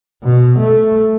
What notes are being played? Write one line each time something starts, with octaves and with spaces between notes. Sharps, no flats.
B2
A3